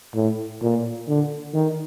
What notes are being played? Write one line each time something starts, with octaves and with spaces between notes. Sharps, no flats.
A2
A#2
D3
D#3